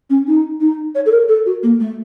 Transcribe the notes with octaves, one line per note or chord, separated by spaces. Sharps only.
C#4
D#4
D#4
C#5
A4
A#4
A4
F#4
A#3
A3